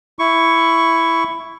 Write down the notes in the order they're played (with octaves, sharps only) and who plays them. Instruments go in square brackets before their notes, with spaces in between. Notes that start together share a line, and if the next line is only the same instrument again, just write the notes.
[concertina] E4 C#6